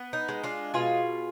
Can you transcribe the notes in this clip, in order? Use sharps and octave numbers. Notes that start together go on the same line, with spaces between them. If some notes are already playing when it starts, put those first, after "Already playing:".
Already playing: B3
D#4
G#3
D4 F4
B2 F4 G#4